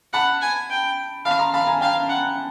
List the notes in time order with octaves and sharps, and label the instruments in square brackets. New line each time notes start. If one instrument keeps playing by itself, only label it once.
[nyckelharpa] F#5 [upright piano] A5 B5
[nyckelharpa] G#5
G5
[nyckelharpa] F5 [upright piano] A5 B5
[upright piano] A#5 C6
[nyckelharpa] F5 [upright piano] A5 B5
[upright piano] G#5 A#5
[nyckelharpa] F5 [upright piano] G5 A5
[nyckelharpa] F#5